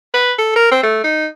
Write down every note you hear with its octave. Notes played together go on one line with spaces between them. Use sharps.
B4
A4
A#4
C4
A3
D#4